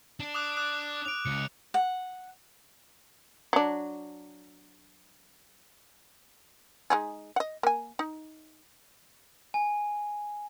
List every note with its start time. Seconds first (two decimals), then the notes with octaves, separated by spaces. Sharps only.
0.20 D4
0.34 D6 D#6 F#6
0.57 D6 D#6 F#6
1.05 D7 F7
1.26 C#2 C#7
1.74 F#5
3.53 F#3 D4
6.90 G#3 D#4 G#4
7.36 D#5 F#5
7.63 A#3 G#5
7.99 D#4
9.54 G#5